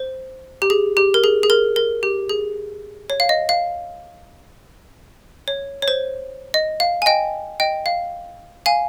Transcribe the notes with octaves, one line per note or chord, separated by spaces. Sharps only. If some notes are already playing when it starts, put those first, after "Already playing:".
Already playing: C5
G4
G#4
G4
A#4
G#4
G#4
A#4
A#4
G4
G#4
C#5
F5
D#5
F5
C#5
C#5
C5
D#5
F5
G#5
D#5 G5
D#5 G5
F5
F5 G#5